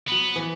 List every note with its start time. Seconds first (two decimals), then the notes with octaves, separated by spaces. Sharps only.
0.08 F#3 B3
0.36 E3